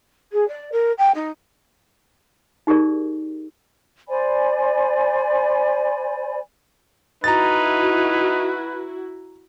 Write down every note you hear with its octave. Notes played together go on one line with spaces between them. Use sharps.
G#4
D5
A#4
G5
D#4
D#4 G4 G#4 A#4 D5
C5 D5 G#5 B5
D#4 E4 F#4 B4 A#5 A6